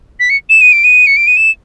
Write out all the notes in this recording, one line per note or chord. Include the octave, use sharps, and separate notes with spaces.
B6
C#7
E7
D#7
D7
D#7
C#7
D7
D#7
E7